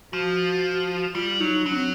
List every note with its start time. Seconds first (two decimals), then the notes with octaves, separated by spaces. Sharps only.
0.12 F3 F#4
1.14 G3 F4
1.40 F#3 D#4
1.65 F#3 D4
1.75 C4